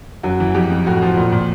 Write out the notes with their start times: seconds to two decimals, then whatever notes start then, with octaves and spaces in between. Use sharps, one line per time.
0.23 F#2 F#4
0.40 E3
0.54 F2 G4
0.71 F2
0.87 A2 F#4
1.02 F3
1.17 A#2
1.32 A#2